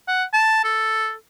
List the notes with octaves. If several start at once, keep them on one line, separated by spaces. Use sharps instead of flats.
F#5
A5
A4